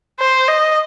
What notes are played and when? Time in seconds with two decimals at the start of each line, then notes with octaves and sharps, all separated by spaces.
0.20 C5
0.48 D#5